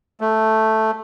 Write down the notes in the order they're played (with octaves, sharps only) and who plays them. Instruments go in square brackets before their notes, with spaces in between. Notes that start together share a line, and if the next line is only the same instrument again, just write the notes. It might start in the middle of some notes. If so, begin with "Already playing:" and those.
[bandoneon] A3